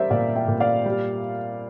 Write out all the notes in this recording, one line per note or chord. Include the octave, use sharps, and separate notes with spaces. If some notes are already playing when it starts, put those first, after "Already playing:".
Already playing: G3 A#4 C5 D5 E5
A#2 D5 F5
E5 G5
A#2
D5 F5
G3